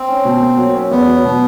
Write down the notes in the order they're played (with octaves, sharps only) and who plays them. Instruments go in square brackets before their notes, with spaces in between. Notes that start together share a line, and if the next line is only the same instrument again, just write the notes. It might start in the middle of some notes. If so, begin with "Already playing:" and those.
Already playing: [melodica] C4
[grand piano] C#4
B2
A#3
F#3
C#4
[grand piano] E2 [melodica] B3
[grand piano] F#3
B2